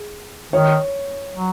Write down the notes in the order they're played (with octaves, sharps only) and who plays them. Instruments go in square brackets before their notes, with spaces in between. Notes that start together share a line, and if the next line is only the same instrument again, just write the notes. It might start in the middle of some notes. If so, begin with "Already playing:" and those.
Already playing: [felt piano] G#4
[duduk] D#3 [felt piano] C#5
[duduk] F#3